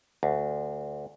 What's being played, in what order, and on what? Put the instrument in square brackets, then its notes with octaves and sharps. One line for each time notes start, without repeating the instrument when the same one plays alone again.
[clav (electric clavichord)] D2